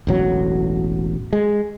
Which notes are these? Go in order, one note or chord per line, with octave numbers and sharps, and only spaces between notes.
E1 A1 F#3
G#3